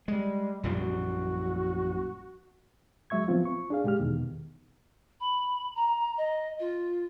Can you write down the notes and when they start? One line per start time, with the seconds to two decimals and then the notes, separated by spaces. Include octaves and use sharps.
0.08 G3 G#3
0.63 A#1 F#2 A#2 G3
0.80 F#4
3.10 F#3 G#3 E5 C#6 G#6
3.28 F3 B3 C4 F4
3.45 C#6
3.70 D4 G#4 F5
3.84 A#2 G#3 G4 F6
4.00 E2 B2 D#3
5.20 B5
5.75 A#5
6.18 D#5
6.60 F4